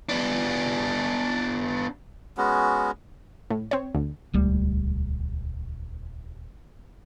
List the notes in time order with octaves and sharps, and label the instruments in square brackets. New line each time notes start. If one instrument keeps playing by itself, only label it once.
[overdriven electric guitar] B3 D4
[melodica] G#3 B3 C#4 F#4
[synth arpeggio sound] A2
C4 C#5
D2
[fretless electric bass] D#1 C#2 G3 A3